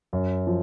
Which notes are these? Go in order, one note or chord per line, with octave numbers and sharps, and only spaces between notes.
F#2
F3